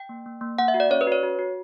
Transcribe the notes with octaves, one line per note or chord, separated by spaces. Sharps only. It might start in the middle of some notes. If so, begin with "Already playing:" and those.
Already playing: G5
A#3
A#3
A#3
A#3 F#5
E5
F#4
D5
C#4 C#5
B4
F#4 C#5
F#4
F#4